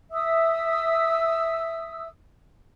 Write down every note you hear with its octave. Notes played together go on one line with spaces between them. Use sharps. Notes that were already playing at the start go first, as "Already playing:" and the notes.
E5 D#6 E6